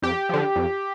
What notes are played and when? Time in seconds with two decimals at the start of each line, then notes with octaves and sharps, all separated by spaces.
0.02 F2 G4
0.29 D3 F3
0.56 F2